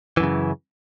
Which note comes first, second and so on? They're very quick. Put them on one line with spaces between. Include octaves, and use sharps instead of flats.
E3 F#2 C#3